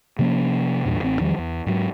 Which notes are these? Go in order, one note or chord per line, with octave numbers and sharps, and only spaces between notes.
C3 F3 A#3 C#4
E2 G2 A#2
A1 C4
E2 D#3 F3 G3
E2
G#2 F#3